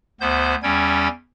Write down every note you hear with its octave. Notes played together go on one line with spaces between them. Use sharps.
D2 B3 C5 G6
E2 G3 C#4 G5 G#6